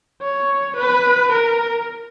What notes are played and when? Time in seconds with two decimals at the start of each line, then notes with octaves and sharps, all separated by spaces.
0.22 C#5
0.77 B4
1.32 A#4